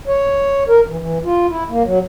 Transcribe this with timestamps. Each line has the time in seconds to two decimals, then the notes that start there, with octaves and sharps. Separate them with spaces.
0.07 C#5
0.68 A#4
0.87 E3
0.99 E3
1.24 F4
1.49 E4
1.70 A#3
1.84 F#3